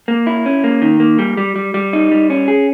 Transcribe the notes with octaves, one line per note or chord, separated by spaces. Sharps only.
A#3
E4
C#4
A#3
D#3
A#3
G3
G3
G3
G3
D#4
G3
C#4
G#4